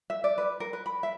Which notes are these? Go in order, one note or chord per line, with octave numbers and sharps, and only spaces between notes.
E5
D5
B4
A#4
B4
B5
E5